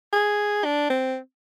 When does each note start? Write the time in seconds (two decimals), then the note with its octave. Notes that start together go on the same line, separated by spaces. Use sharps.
0.13 G#4
0.65 D4
0.90 C4